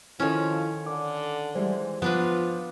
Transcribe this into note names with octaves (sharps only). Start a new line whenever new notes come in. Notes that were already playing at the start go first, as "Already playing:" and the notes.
D#3 F3 C#4 E4 A4
D3 D6
E3 G3 G#3 C5
F3 B3 D4 F4 B4